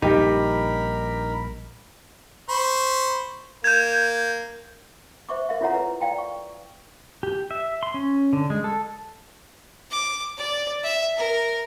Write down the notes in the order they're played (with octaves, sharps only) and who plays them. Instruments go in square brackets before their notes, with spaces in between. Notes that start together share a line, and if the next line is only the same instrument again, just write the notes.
[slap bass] A#1 G3 [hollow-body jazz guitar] D#4 [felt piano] G4 [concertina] A#4 B5
[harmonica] C5 B5 C#6
[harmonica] A#3 [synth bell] G6 G#6
[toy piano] C5 E5 C#6 D6
A#4 E5 F5
E4 F4 A4 C#5 F#5 A#5
B4 A#5
D5 F5 G5 A#5
C#6
[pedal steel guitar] G4
E5
C6
C#4
D3
G#3
A4
[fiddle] D6
D5
E5
A#4